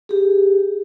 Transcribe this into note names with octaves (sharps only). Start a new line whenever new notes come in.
G4 G#4